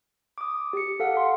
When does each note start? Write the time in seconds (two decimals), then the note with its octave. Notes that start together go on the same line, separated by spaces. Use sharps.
0.38 D6 D#6
0.73 G4 C#7
1.00 A4 F5 F#5
1.17 C6